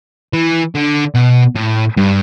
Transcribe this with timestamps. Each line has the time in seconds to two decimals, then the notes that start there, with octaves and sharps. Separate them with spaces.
0.33 E3
0.75 D3
1.15 B2
1.56 A2
1.97 G2